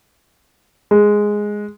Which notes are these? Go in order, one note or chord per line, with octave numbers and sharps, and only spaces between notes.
G#3